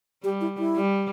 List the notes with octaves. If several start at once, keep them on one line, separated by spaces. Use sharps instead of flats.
G3 G4
E4
E4
G3